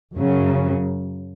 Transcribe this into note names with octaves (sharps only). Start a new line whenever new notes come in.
F#2 C#3 F#3